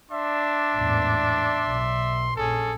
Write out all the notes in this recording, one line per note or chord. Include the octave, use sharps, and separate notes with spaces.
D4 D5 E5 C6
A1 E2 G#2
B1
A#1 F#2 C#4 G#4 A4